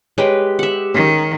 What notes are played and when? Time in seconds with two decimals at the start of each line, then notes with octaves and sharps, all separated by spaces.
0.18 G#3 G4 B4 C#5 G5
0.59 E5 F#5
0.94 D#3 C#4